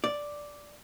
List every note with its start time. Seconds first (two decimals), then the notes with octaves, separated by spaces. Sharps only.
0.04 D5